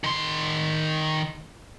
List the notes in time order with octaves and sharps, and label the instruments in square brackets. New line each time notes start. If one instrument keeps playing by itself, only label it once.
[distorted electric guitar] D#3 C6